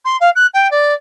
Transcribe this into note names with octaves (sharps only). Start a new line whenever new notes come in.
C6
F5
F#6
G5
D5